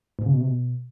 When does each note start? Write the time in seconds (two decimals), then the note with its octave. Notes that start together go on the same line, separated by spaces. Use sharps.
0.19 G#2
0.26 C#3
0.33 B2
0.40 C3
0.48 B2